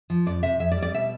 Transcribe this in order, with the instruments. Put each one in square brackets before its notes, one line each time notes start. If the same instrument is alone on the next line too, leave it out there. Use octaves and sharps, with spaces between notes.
[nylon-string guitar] F3
F2 D5
C3 E5
F2 E5
D5
G3
D5
B2 E5